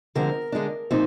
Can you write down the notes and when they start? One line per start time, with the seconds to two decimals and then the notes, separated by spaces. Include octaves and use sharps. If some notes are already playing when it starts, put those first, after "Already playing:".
0.15 D3 F3 G#3 C4 A#4
0.52 D3 G#3 D4
0.91 A#2 F3 C4 D#4